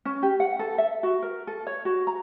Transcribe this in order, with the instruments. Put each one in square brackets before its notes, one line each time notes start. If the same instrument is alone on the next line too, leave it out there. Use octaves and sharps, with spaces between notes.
[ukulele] C#4
G4
F#5
A4
E5
F#4
A#4
A4
C#5
F#4
A#5